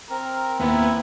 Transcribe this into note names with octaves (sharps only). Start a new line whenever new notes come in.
C4 A#4
D#2 B3 E4